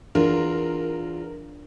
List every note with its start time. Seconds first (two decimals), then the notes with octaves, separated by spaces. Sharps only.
0.15 E2 D4 F4 A#4